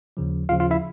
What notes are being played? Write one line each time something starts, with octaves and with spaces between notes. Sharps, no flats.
D#2 C#3 F3
D#2 C#3 F3 F4 F5
F4 F5
E4 E5